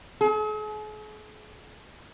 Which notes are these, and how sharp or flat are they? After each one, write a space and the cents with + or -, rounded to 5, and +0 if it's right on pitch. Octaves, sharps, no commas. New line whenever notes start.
G#4 +45